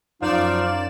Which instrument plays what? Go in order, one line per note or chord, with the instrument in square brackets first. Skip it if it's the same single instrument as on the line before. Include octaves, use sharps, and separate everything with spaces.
[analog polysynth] F#2 D5 E7 [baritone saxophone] F3 [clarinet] D#4 [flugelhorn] F5